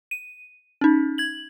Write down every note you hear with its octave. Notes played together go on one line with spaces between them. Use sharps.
D#7
C#4 D#4
G#6 F#7